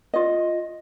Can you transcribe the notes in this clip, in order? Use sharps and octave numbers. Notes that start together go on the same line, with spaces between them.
F4 D#5